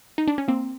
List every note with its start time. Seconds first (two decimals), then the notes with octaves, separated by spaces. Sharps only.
0.18 D#4
0.27 D4
0.38 C#4
0.48 A#3 C4